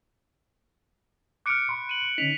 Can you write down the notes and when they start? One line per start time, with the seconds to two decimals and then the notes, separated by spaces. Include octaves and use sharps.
1.46 D6 F6 F#6 C#7 D7
1.69 B5 C6
1.89 D#7 F#7
2.18 D3 C#4 D#4 B6 F7